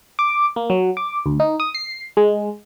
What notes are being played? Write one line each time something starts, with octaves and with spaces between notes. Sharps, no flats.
D6
A#3
F#3
D6
D2
D#4
D#6
C7
G#3